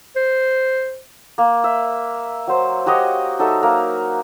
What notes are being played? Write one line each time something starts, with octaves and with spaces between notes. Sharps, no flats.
C5
A#3
E5
F#3 C5
F#4 G4 C#5 D#5
F#3 D#4 A4 E5
A#3 A#4